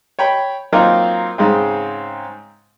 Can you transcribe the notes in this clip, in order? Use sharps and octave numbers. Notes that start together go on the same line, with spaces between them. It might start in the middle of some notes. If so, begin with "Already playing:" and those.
C#5 G5 B5
F#3 A#3 C4 D#4 F4 A#4
G#2 C#3 C4